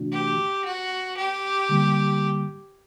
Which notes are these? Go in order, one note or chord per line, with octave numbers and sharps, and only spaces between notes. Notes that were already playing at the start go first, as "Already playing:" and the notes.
Already playing: C3 E3 A3 D4 F#4
G4
F#4
G4
D3 G3 A#3